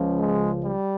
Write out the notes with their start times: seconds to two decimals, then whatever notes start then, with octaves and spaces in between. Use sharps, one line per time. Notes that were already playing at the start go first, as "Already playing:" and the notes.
Already playing: C#2 C#3 F3
0.19 G#3
0.64 G3